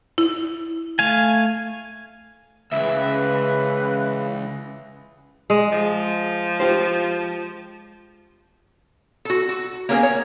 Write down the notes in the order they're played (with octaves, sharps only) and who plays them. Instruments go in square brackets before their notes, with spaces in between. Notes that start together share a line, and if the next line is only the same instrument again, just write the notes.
[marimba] E4
[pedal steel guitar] A3 F5 G#5
[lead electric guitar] C#2 [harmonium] C#3 E3 [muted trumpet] B4 [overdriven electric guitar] E5
[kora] G#3
[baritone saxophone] F3
[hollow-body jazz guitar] F4 G4 C5
[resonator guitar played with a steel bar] F#4 A4
F#4
A#3 B3 C#4 G#4 A#4
C#5